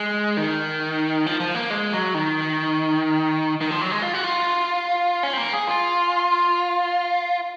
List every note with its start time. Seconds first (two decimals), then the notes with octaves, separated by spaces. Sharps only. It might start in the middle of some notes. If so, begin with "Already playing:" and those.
Already playing: G#3
0.37 D#3
1.26 F3
1.40 F3
1.55 A#3
1.70 G#3
1.93 F#3
2.14 D#3
3.61 D#3
3.71 F3
3.81 F#3
3.91 G#3
4.02 F4
4.13 F#4
4.24 F4
5.23 C#4
5.33 C4
5.38 A#3
5.53 G#4
5.67 F4